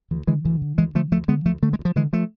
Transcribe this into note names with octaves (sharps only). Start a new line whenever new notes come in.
D2 E3
D3 E3 G#3
D2 E3
D3
D2 E3 G#3
D3 F3 A3
D2 F3 A3
D3 G#3 B3
D2 F3 A3
D3 A3
G#3
D2
F3
D3 E3 G#3
F3 A3